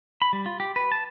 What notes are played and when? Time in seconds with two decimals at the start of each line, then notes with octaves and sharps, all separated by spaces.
0.22 B5
0.33 G3
0.46 F4
0.60 G4
0.76 B4
0.92 A5